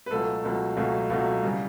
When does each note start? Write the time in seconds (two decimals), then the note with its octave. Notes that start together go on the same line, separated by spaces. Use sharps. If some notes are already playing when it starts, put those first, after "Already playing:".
0.06 B4
0.11 C#2 B2 F#3 A3 A4
0.43 C#2 B2 F#3 A3
0.77 C#2 B2 F#3 A3
1.10 C#2 B2 F#3 A3
1.43 C#3 E3 G3